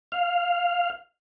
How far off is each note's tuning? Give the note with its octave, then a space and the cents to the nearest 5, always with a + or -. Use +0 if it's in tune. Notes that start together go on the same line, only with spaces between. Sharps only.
F5 -5